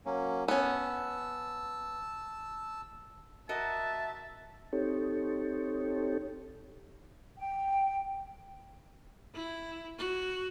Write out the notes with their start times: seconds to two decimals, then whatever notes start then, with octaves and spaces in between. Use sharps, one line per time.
0.06 F#3 A#3 C#4
0.48 B3 C#4 A5 E6
3.49 F#4 A#4 D#5 E5 A5
4.73 C4 D#4 G4 A4 C#5
7.38 G5
9.34 E4
9.98 F#4